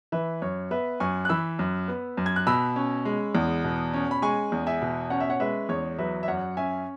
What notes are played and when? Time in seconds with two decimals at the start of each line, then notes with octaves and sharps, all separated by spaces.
0.12 E3 B4 E5
0.42 F#2 C#5
0.71 B3 B4 E5
1.00 F#2 G#5 C#6
1.25 F#6
1.29 E3 B5 E6
1.59 F#2
1.88 B3
2.17 F#2
2.26 G#6
2.36 F#6
2.47 B2 B5 E6
2.76 C#4
3.05 G#3
3.35 E2
3.64 B2
3.94 C#4
4.11 B5
4.22 G#3 G#5 C#6
4.52 E2
4.67 E5 G#5
4.82 B2
5.10 C#4 F#5
5.20 E5
5.30 C#5 F#5
5.40 G#3 B4 E5
5.69 E2 C#5
5.98 F#3 B4 E5
6.23 E5
6.27 F#2 C#5 F#5
6.57 C#4 E5 G#5